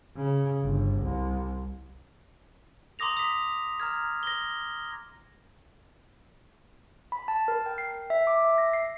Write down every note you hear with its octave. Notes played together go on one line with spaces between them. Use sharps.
C#3
G1
C2
A#5 C6 D6 D#6 A#6 F7
D#6 B6
A#5 F6 G#6
A#6 G7
B5
A5
A#4
G5
C7
E5
D6
E5
A#6
C7